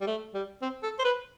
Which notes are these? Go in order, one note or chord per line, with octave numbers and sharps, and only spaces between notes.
G3
A3
G3
C4
A4
C5
B4